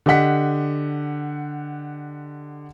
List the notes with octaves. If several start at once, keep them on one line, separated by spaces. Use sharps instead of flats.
D3 G4 D#5 F#5 B6